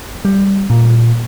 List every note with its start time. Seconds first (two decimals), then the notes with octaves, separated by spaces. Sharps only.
0.25 G3
0.70 A#2